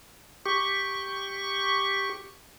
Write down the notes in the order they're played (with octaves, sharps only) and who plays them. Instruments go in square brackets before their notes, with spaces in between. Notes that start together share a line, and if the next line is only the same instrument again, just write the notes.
[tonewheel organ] G4 C#6